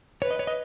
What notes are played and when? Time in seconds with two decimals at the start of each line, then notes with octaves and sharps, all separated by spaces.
0.22 B4 C#5
0.31 D#5
0.39 C#5
0.47 D#5